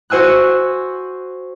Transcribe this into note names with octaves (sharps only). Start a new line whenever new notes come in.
F#4 C5 G#5 E6 F#6